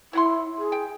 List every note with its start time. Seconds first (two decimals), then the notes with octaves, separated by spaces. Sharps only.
0.13 E4 C#5 F#5 C6
0.58 G#4
0.72 G5